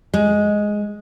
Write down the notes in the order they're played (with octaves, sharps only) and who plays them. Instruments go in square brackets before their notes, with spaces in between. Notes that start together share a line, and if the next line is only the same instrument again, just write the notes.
[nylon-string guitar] G#3